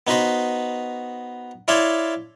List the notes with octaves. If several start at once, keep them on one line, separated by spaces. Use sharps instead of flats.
B3 D#4 F#4 B4 C5 D#5
E4 C#5 D5 F5 A5 C6